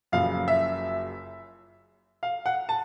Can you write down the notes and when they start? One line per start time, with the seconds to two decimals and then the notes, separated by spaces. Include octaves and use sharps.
0.12 F#1 F#2 C#3 F3 F5
0.48 E5
2.23 F5
2.46 F#5
2.69 A5